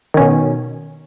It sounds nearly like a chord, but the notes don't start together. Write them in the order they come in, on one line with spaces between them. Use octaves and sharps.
D#3 C#4 B2